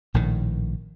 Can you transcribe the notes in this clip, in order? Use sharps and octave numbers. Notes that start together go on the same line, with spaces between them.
A#1 A2 D#3